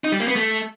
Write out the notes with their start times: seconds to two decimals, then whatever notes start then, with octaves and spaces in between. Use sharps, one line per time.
0.04 D#4
0.12 G3
0.20 A#3
0.28 B3
0.36 A3